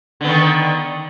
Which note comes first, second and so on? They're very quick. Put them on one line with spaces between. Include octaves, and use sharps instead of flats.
D3 B3 D#3